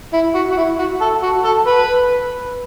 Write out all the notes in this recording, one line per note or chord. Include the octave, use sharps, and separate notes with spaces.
E4
F#4
F#4
E4
F#4
A4
F#4
A4
B4